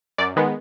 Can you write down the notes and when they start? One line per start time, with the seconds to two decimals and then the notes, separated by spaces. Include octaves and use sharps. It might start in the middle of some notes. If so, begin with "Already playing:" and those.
0.18 F#2 D5
0.36 D#3 G#3 B3